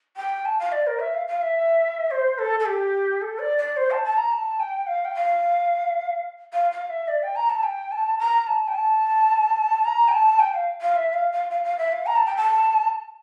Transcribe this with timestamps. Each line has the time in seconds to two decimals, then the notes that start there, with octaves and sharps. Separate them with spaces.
0.16 G5
0.45 A5
0.59 F5
0.72 D5
0.86 A#4
0.99 E5
1.14 F5
1.27 F5
1.41 E5
2.10 C5
2.38 A4
2.59 A4
2.65 G4
3.21 A4
3.39 D5
3.58 D5
3.76 C5
3.91 A5
4.04 A5
4.17 A#5
4.31 A5
4.59 G5
4.87 F5
5.04 G5
5.14 F5
6.53 F5
6.71 F5
6.89 E5
7.08 D5
7.22 G5
7.36 A#5
7.49 A5
7.63 G5
7.91 A5
8.18 A#5
8.46 A5
8.67 G5
8.74 A5
9.84 A#5
10.08 G5
10.12 A5
10.39 G5
10.53 F5
10.81 F5
10.96 E5
11.13 F5
11.32 F5
11.50 F5
11.64 F5
11.78 E5
11.92 F5
12.06 A#5
12.15 A5
12.26 G5
12.36 A5